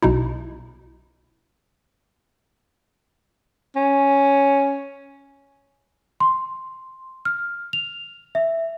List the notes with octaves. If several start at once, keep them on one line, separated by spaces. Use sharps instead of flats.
B1 B2 D#4 E4
C#4
C6
F6
F7
E5